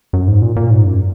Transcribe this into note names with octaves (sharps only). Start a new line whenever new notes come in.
F#2
G#2
A#2
A#2
G#2
F#2